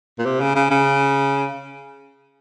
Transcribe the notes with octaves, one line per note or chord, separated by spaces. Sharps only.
A#2
C3
C#3
C#3
C#3